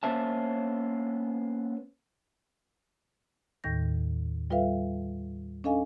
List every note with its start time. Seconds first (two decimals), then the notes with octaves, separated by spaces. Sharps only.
0.03 A#3 B3 C#4 C5 E5 A5
3.64 D#2 A2 D#3 G6 A#6
4.50 G3 F4 A4 B4 E5 F5
5.64 C#4 D4 A4 D#5 F5 G#5